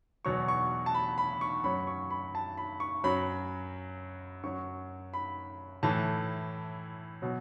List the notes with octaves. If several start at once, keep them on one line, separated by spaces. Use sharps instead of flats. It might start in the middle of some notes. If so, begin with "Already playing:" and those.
E2 B2 F#3 C#6
C#6
A5
B5
B5
C#6
F#2 F#3 B5
C#6
B5
A5
B5
C#6
F#2 F#3 B5
F#2 F#3 C#6
B5
A2 E3 A5
B2 F#3